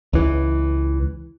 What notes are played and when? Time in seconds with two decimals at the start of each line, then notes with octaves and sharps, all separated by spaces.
0.13 C#2 E3